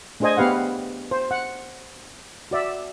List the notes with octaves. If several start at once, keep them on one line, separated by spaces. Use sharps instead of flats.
A3 D4 G#4 C5 D#5 G#5
B3 G4 B4 F5 F#5
C5
F#5
F#4 D5 E5